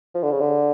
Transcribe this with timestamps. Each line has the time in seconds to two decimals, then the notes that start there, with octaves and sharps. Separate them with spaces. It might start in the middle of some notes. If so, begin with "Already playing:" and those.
0.15 F3
0.23 D3
0.32 C#3
0.40 D3